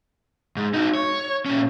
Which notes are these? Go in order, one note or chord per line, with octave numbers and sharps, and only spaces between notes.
G#2
D#4 F#4
C#5
A#2 C#4